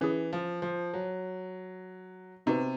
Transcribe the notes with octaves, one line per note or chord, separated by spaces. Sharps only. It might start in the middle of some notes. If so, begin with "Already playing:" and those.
E3 C#4 E4 G#4
F3
F3
F#3
C3 B3 D#4 F#4 B4